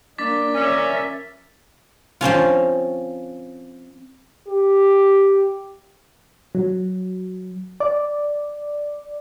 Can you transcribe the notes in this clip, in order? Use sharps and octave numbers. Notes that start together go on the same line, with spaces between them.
A#3 D4 D5 D6 A6 B6
C#4 A#4 E5
F3 C4 C#4 F4
G4
F#3
D5